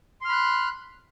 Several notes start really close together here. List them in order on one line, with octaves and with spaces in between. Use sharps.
C6 F6 B5 F#6